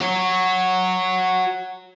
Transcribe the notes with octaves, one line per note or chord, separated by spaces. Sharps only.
F#4 C#5